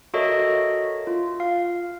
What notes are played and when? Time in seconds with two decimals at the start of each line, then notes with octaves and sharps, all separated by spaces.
0.14 F#4 A4 A#4 C#5 D#5 E5
1.07 F4
1.40 F5